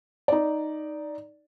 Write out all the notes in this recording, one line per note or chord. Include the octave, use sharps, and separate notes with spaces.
D#4 D5